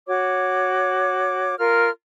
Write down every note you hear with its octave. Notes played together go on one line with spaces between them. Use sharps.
F#4 C#5 D6
F4 A#4 F6